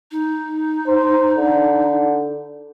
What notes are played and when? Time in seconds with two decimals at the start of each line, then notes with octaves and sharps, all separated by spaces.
0.11 D#4
0.87 C5
1.37 D3